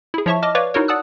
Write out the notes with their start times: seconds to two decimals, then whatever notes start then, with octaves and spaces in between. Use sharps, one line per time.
0.14 E4 G#4
0.26 F3 E4 C#5 E5 A5 C#6
0.42 D#5 A5 D6 F6 A#6
0.55 B4 C#5 D5 F5 C#6 D6
0.74 D#4 E4 F#4 A#4 C#5
0.88 D5 F#5 A5 D#6 E6 F#6